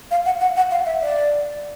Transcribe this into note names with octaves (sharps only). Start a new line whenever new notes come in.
F5
F#5
F#5
F#5
F5
E5
D5